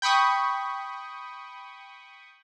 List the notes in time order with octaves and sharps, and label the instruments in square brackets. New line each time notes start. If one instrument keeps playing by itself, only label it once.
[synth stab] G5 B5 C#6 D#6